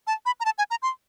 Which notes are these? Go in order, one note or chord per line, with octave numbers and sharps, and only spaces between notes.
A5
B5
A#5
A5
G#5
A#5
C6